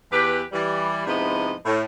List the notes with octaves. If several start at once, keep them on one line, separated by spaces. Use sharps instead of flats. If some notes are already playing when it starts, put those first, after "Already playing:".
E2 G4 B4
E3 G3
G#2 C3 F3 B3 E4 D#5
A2